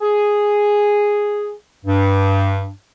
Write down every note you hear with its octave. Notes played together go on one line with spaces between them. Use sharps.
G#4
G2